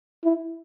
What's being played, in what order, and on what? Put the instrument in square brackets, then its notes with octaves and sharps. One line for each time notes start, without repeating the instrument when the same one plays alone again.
[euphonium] E4